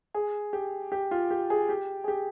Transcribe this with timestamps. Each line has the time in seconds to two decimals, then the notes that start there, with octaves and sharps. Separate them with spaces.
0.15 G#4
0.53 G4
0.92 G4
1.11 F4
1.31 G4
1.50 G#4
1.69 G4
2.04 G#4
2.08 G4